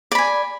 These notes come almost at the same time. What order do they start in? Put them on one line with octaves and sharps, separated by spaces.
D5 B5 G#5